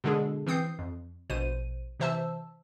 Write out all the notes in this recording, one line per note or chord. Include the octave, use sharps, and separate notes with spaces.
B2 D3 G#3 D4 G#4 A4
E3 C4 D#6 G6 C7
F2
A#1 B2 C5 D#7
C3 E3 C5 E5 A5 E6